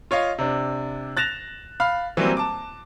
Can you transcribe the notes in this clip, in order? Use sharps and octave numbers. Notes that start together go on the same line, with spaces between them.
F4 C#5 D#5 F5
C3 D4
F#6 A6 A#6 E7 F7
F5 B5 F6
E3 F#3 G3 A#3 C4
A5 D6